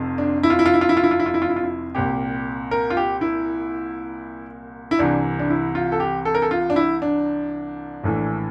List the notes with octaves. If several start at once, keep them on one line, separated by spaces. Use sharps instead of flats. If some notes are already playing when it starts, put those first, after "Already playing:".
Already playing: F1 F2 C3
D4
E4
F4
E4
F4
E4
F4
E4
F4
E4
F4
E4
F4
E4
F4
E4
F4
E4
C2 A#2 G4
A#4
F4
G4
E4
E4
C2 C3 E3 D4
D4
E4
F4
A4
G4
A4
A#4
A4
F4
D4
E4
D4
A#1 A2 E3